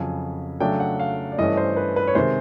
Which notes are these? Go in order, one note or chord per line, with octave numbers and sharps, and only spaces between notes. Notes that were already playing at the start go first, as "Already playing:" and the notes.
Already playing: F2 C#3 F#3 G#5
C#3 F#3 A3 D4 G5
F#5
F5
D5
G2 E3 A3 C#4 D#5
C5
B4
B4
C#5
C3 D#3 G#3 C5